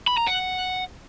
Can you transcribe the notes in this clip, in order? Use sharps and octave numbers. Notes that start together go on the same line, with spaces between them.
B5
A#5
F#5